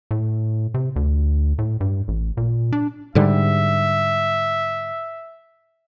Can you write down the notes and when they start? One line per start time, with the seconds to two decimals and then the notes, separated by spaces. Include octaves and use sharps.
0.11 A2
0.74 C3
0.96 D2
1.59 A2
1.80 G2
2.08 A1
2.37 A#2
2.73 D4
3.15 G#2 D3 G3 E5